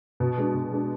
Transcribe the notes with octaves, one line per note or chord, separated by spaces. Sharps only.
B2
G#3 D4
B2
G#3 D4